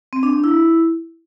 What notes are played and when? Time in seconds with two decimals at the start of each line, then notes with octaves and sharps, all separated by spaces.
0.13 C4
0.23 D4
0.33 D4
0.44 E4